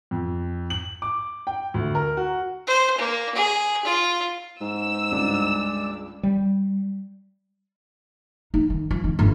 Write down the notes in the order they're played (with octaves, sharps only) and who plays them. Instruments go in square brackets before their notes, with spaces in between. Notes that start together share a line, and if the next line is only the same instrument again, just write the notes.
[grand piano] F2
F#7
D6
G5
D2
A#4
F#4
[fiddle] C5
A#3
G#4
F4
[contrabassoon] G#2 [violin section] E6
[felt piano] C#2 G2 [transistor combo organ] G#3 D5
[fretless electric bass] G3
[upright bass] D#4
D#3
F3
D#3
G1 F2